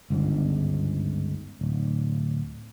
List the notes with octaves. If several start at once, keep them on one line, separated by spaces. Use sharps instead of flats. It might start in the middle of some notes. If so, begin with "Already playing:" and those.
G1 C#2 G#2
D1